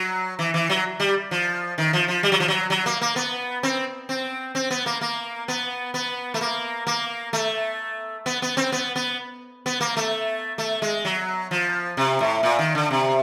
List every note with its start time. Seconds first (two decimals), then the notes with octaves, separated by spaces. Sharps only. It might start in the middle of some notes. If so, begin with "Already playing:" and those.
Already playing: F#3
0.39 E3
0.54 E3
0.69 F#3
1.00 G3
1.31 F3
1.78 D#3
1.93 F3
2.08 F3
2.23 G3
2.32 F#3
2.40 F3
2.48 F#3
2.70 F#3
2.86 A#3
3.01 A#3
3.16 B3
3.63 C4
4.09 C4
4.55 C4
4.70 B3
4.86 A#3
5.01 A#3
5.48 B3
5.94 B3
6.34 A3
6.41 A#3
6.87 A#3
7.33 A3
8.26 B3
8.42 B3
8.57 C4
8.72 B3
8.96 B3
9.66 B3
9.81 A#3
9.97 A3
10.58 A3
10.82 G#3
11.05 F#3
11.51 F3
11.97 C3
12.20 A2
12.43 A#2
12.59 D#3
12.75 D3
12.91 C3